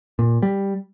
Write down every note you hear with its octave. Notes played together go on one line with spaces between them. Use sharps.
A#2
G3